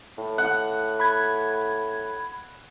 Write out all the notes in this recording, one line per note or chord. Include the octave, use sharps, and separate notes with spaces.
A2
F#5
B5 G#6